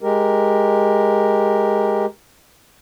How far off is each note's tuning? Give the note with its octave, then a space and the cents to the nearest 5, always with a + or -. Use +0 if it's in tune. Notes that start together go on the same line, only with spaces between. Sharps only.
G#3 +0 G4 +0 A#4 +0